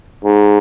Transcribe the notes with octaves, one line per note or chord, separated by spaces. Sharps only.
G#2